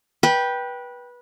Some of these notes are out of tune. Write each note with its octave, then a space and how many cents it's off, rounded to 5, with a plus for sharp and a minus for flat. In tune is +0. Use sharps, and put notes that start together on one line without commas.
B4 -20 G5 +0